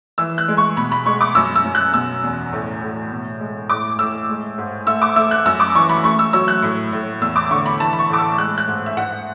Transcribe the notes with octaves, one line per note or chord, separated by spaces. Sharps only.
E3 E6
F#6
G#3
C#6
B2 B5
B5
G#3 C#6
D6
F#2 E6
E6
F#2
F#6
B2 E6
E2
A2
A2
B2
G#3
A2 D6
A2 E6
G#3
G#2
A3 E6
D6
A3 E6
F#6
F#2 E6
D6
E3 C#6
B5
A3 C#6
E6
F#3 E6
F#6
A2
A2
E2 E6
D6
D3 C#6
B5
E3 A5
B5
C#6
A2 D6
E6
G#3 F#6
F#6
G#2
E5
G#2 F#5